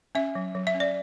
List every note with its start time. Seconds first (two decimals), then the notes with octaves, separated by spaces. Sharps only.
0.15 C#4 E5
0.35 F#3
0.55 F#3
0.67 E5
0.74 C#4
0.80 D5